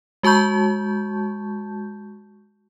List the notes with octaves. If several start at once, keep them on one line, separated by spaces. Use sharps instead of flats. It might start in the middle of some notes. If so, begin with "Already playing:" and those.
G#3 F#4 A5 C#6 G6